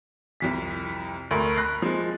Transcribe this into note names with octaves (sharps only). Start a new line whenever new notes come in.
C2 F2 B6
D2 A#4 B5
B5 F#6 A#6 C7
F3 G#3